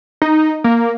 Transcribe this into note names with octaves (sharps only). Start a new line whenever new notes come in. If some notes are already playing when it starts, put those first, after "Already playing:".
D#4
A#3